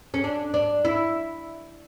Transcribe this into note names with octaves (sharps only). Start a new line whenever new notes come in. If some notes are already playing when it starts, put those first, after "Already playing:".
C#4
D4
D4
E4